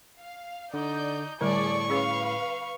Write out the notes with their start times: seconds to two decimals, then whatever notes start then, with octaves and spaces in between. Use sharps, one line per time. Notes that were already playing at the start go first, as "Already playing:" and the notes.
0.20 F5
0.74 D3 D#4 D5 G6
1.41 A2 D3 G3 G#4 A4 D5 C#6
1.90 C#4 G#4 B4 C#5 F5
2.25 C#6